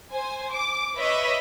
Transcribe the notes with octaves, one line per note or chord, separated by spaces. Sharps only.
C5 G#5
D6
B4 C#5 D#5 E5 B5